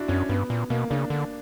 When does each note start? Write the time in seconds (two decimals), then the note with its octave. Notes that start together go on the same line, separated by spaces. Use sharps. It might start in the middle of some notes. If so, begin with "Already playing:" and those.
Already playing: D4 E4 F#4
0.08 F#2 C#4
0.29 G2 B3
0.50 A#2
0.70 B2 A#3
0.90 C#3 D4
1.10 D3